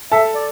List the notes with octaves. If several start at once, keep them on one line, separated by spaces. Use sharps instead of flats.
A4 E5 A5
D5